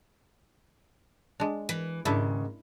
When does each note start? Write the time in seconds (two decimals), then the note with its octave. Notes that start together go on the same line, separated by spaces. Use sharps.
1.40 G#3 D4
1.69 E3
2.05 D#2 G#2 C#3 D4 E4